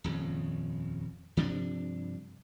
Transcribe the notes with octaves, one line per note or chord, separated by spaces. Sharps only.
D#1 F2 C#3
G2 C3 F3 D4